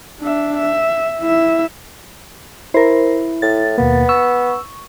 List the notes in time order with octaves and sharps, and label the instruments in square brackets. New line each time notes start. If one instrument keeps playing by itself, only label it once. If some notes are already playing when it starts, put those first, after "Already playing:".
[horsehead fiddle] D4 E5
E5
E4 E5
[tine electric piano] E4 [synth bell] A#4 C5
[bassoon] A2 [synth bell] A6
[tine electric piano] D#2 B2 A#3 [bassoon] B3
[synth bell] C#6 [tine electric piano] E6